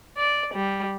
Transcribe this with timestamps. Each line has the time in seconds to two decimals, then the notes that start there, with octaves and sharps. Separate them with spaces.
0.17 D5
0.54 G3